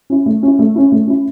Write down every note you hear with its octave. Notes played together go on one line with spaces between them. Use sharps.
C#4 E4
A3
C#4 E4
A3
C#4 E4
A3
C#4 E4